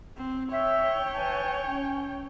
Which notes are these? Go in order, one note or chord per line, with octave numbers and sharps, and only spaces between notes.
C4
C#5 E5 G5
B4 G#5 A5
C#4